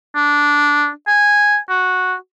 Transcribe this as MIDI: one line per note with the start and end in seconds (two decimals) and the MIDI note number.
0.15 0.89 62
1.07 1.57 80
1.69 2.15 66